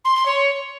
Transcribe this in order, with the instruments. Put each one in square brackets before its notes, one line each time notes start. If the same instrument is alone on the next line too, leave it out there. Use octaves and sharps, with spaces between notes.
[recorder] C6
C6
C#5